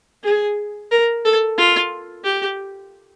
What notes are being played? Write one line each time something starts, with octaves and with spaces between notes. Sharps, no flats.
G#4
A#4
A4
F4
G4